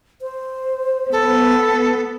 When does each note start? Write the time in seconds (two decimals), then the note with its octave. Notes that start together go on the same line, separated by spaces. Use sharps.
0.22 C5
1.12 B3 A4